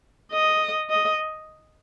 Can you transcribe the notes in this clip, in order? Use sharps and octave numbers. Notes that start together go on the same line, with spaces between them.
D#5
D#5